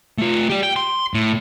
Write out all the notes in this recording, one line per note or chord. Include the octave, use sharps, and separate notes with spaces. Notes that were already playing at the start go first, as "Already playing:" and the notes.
A3 F4
G4 D5
G5
C6
A2